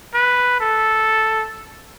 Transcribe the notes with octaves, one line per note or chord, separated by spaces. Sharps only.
B4
A4